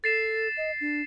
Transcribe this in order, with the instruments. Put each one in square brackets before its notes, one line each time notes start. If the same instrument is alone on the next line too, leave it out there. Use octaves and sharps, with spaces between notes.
[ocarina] A4 [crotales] A6 C7 E7
[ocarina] D#5
D4